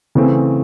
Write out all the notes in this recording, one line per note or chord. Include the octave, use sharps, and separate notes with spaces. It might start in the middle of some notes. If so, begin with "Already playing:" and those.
C#3 E3 A3 C4